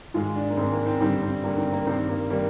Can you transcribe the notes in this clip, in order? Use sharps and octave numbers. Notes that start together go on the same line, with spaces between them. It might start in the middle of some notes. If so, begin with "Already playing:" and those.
G#2 D#3 G#3 F4
D4
A#3
G#2 D#3 G#3 C4
A#3
C4
G2 D3 G3 C4
C4
G2 D3 G3 A#3
C4
A#3
G2 D#3 G3 C4
A#3
D#3 G3 A#3